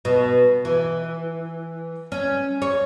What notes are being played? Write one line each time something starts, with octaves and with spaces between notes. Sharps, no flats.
B2
E3
C#4
C#5